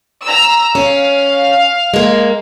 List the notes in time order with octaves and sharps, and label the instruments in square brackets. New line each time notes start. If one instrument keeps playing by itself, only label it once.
[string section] A#5 E6
[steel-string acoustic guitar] C#4 [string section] F5
[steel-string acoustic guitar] G#3 A#3